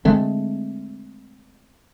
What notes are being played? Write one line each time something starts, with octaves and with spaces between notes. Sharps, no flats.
D3 G#3 A3 C4